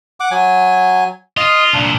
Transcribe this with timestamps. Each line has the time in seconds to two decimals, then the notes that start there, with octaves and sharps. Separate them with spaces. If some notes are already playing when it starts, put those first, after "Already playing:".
0.20 F#5 D6
0.31 F#3 G#5
1.37 F4 D#5
1.73 C2 A#2 D4